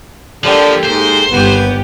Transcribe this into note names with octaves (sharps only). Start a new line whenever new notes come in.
D3 F3 A#3 G4 A4
G#2 C5
G1 D#2 B3 G4